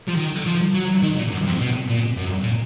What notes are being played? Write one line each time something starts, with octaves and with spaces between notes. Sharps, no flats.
F3
D#3
F3
F#3
D#3
A#2
F#2
F2
B2
A#2
F#2
A#2